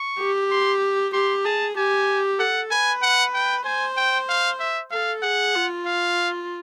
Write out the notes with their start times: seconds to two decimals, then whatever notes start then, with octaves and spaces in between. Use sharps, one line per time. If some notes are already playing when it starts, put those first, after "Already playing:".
Already playing: C#6
0.19 G4
0.51 C6
1.13 G4 C6
1.45 G#4 A5
1.77 G4 G#5
2.39 A4 F#5
2.71 B4 G#5
3.02 F#5
3.34 G5
3.65 C5 G#5
3.97 G5
4.29 F5
4.60 E5
4.91 A4 F5
5.23 G#4 F#5
5.55 F4
5.86 F5